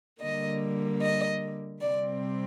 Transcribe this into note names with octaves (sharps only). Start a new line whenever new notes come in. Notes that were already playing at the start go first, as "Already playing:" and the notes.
D3 G3 A#3 D#5
D#5
C3 G3 C4 D5